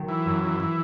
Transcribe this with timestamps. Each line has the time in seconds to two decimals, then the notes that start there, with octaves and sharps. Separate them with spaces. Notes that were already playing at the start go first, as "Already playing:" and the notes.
Already playing: D#3 F#3
0.08 E3
0.26 F#2
0.44 E3
0.60 E3